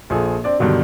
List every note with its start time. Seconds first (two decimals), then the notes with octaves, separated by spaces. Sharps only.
0.10 A#1 F3 G#4 A4
0.44 C4 D4 D5
0.59 G2 B2 D3 D#3 F#3